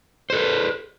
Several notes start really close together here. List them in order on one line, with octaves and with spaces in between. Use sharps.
C5 A4 B4